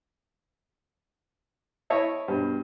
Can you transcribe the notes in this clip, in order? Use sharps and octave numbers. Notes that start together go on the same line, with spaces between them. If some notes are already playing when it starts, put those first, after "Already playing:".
E4 C#5 D#5 E5 A5
G2 B2